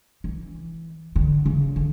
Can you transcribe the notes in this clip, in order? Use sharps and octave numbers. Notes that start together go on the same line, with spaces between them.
E3
D3
C#3
D3